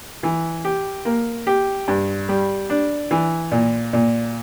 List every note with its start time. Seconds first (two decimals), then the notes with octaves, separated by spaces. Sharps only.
0.23 E3
0.65 G4
1.05 A#3
1.47 G4
1.88 G2
2.29 G3
2.70 D4
3.11 E3
3.52 A#2
3.93 A#2